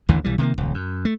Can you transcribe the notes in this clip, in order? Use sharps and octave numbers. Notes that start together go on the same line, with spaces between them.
A1 D#2 D3 E3
B1 E3 G3
C3 D#3 A3 A#3
D#1 C#2
F#2
A3